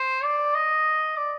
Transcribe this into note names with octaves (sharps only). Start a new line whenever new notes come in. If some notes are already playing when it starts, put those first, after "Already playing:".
Already playing: C5
D5
D#5
D5